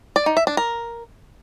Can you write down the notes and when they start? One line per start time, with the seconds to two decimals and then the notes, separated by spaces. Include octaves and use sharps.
0.16 D5
0.26 D#4
0.37 E5
0.47 D4
0.57 A#4